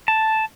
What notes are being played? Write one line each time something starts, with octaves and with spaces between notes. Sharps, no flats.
A5